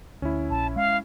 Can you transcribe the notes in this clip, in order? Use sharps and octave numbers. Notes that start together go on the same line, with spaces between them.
D2 C#4 E4
A#1 A5
G#3 F5